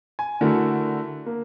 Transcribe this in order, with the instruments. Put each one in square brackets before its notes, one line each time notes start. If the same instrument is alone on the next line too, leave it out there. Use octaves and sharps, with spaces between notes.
[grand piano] G#5
D3 A3 E4 F#4 A#4
A#3